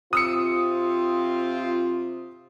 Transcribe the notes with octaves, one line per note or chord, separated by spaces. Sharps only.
C3 C4 F4 D#6 E6 C#7